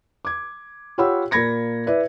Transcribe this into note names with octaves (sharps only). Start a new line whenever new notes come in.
D6 G#6
F4 G4 C#5 F#5 B5 E6
A#2 A#3 B5 G#6 A#6 C#7
E4 B4 D5 E5